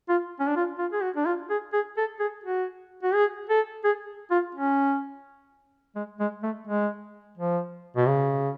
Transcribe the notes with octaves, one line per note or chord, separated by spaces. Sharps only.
F4
C#4
D4
F4
F4
G#4
F#4
D4
F4
G#4
G#4
A4
G#4
F#4
F#4
G#4
A4
G#4
F4
C#4
G#3
G#3
A3
G#3
F3
B2
C#3